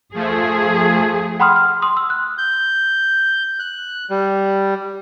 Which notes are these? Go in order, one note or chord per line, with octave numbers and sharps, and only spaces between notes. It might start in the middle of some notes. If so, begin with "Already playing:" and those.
F3 A3 G#4
F#5 G5 B5 C6 D#6 F6
F6
C6 D#6
E6
F#6
G6
F#6
G3